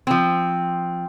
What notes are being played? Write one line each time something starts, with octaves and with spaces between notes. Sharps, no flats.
F3 C4